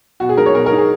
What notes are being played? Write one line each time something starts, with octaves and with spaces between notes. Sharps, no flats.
B2 F#4
G#4
G#3 D#4 A#4
C#5
B2 A#4
A#4
G#3 D#4
G#4